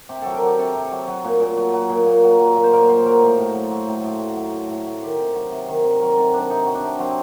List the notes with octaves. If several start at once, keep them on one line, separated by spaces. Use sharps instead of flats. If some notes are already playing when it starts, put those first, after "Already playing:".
C3 G4
F#3 A4
A#4
F#3 G4
C3 A4
C3
F#3
F#3
A#2
A#2
F#3
F#3
A#2
A#2
F#3
F#3
A#2
C5
A#2 A#4
F#3 C5
F#3 A#4
A2
A2
F#3
F#3
A2
A2
F#3
F#3
A2
A2
F#3
D#3 G4
C3
F#3
C3
D#3
C3
F#3 A#4
C3 A4
D#3 D4
C3 D#4
F#3
D4
C3
F#3 C4